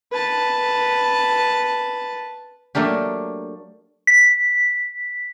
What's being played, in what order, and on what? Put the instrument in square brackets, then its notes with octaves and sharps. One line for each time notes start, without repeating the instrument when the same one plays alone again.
[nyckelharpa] B4 A5
[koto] F#3 A3 A#3 D4 G4
[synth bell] B6